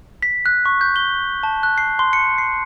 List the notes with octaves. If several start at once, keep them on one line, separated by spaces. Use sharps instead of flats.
B6
F#6
C#6
G6
G7
A5
F#6
C7
C6
C#7
C7